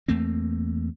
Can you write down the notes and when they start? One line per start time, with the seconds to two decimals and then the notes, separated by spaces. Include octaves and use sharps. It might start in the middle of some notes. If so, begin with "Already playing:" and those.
0.08 E2 A3 A#3 C4